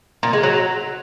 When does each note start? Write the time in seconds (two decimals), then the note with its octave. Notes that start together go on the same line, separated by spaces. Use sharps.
0.23 A#2
0.33 G#3
0.43 F#3